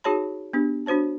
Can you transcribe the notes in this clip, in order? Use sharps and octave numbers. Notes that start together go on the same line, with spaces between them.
D#4 F#4 G#4 C#5 A5 B5
B3 D4 G4
D4 F#4 C5 C#5 A5